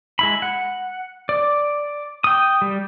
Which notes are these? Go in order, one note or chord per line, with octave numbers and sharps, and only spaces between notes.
G#3 E4 B5
F#5
D5
G5 D#6
G3